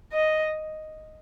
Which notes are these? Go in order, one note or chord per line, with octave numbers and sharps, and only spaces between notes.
D#5